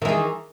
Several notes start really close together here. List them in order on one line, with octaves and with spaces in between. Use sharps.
D#3 E3 G#4